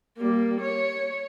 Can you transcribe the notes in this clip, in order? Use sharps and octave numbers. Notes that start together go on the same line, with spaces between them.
G3 A#3
C#5